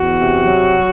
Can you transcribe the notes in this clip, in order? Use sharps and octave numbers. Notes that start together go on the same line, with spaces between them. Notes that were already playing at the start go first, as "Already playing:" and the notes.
Already playing: E2 F#4
C3
F#3